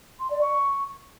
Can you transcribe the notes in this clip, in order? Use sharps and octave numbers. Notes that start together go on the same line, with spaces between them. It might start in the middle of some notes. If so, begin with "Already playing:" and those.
C6
D5
C#6